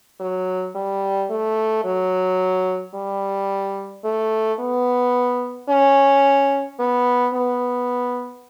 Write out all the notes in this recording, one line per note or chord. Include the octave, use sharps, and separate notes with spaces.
F#3
G3
A3
F#3
G3
A3
B3
C#4
B3
B3